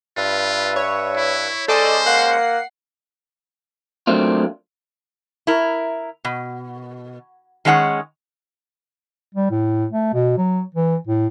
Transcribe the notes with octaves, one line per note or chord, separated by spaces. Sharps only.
G2 F4 B4 E5
C#5
E4
G#3 C#4 A4 C5 D5 D#5
A#3 F#5 C7
F#3 A3 A#3 C4 D4 F4
E4 A#4
B2
D#3 G#3 C#4 F5 F#5
G3
A2
A3
B2
F#3
E3
A2